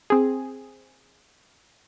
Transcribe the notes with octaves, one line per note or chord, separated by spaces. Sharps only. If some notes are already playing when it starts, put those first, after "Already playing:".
C4 G#4